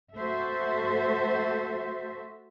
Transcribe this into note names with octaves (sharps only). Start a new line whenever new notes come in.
A3 F#4 A4 C5 E5